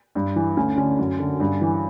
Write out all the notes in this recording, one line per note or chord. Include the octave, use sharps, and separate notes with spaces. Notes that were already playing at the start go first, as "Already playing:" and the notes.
G2
E3
D2 C#4
D3 C#4
F#2
D3
G2
E3